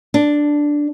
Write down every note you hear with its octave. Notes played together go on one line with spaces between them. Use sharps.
D4